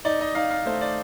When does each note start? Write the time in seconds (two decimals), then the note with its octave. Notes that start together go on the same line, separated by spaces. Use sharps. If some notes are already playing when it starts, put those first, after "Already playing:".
0.05 D#4 D5
0.21 D#5
0.35 D#4 F5
0.50 F5
0.66 A3 C5
0.81 D5